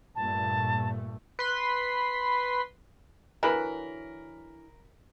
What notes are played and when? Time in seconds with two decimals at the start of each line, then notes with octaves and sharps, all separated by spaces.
0.15 G2 A#2 A3 A5
1.39 B4 C6 B6
3.43 D3 E3 F#3 A#4 B5